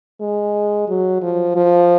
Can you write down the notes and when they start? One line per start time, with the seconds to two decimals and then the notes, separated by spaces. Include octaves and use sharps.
0.21 G#3
0.89 F#3
1.22 F3
1.56 F3